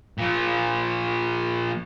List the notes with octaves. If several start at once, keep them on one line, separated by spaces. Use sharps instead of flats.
A#2 F3